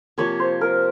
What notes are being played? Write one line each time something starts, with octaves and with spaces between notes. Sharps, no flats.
C3 F3 A#3 C#5
C5
A#4